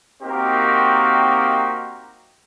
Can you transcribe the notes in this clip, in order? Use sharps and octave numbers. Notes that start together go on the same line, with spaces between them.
A#3 C4 D#4 F#4 G4 A#4